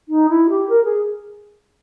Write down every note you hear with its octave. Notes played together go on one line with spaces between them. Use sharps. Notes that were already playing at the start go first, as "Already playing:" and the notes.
D#4
E4
G4
A#4
G#4